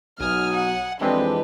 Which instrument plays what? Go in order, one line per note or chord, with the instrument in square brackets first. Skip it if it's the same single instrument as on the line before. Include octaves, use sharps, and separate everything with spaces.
[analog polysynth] B1 D#6 [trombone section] B2 F#3 [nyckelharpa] G#5 [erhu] F6
[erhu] F#5
[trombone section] F2 D4 [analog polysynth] E3 G#3 C4 [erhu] G4 [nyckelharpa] B4